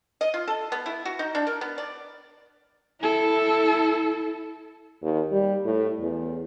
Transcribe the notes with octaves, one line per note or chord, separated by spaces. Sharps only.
D#5
F4
A4
B3
E4
F#4
D#4
D4
A#4
B3
D5
E4 A4
D#2
G3
A2
E2